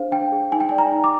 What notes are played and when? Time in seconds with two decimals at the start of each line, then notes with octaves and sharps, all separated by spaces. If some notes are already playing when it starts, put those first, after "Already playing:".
Already playing: D4 G#4 C5 F5
0.12 D4 G5
0.32 G#4
0.52 D#4 G#5
0.60 G5
0.69 D5 G#5
0.78 A#5
0.92 D#4
1.04 D6